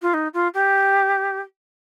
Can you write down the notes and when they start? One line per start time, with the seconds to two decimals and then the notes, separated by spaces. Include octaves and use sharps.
0.02 F4
0.14 D#4
0.34 F4
0.54 G4